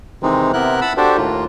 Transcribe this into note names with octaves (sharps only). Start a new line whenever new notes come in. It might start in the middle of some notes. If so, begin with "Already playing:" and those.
C3 D#3 E3 G#3 C4 D#4
C3 B3 E4 A#4 F#6
F#5 A5 B5 E6
D4 F#4 G4 A4 C5
D#2 A2 A#3 F4